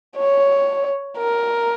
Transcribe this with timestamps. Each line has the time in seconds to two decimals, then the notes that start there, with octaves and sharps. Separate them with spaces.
0.17 C#5
1.18 A#4